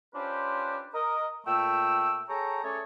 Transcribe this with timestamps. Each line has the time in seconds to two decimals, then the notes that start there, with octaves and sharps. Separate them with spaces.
0.15 C#4 D4 F4 G4 B4 C5
0.94 A#4 D#5
1.47 A#2 A3 G5 E6
2.29 G#4 A4 C#5 G5 A#5
2.64 A3 C#4 G#4 A4 C#5 D5